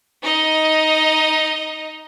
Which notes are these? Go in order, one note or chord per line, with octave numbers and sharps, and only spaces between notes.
D#4 D#5